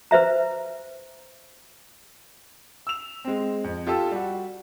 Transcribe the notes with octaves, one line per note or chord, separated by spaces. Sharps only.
B4 C5 E5 A#5
E6 F7
G#3 C4
F2
F4 G4 A4 E6
G3 F#4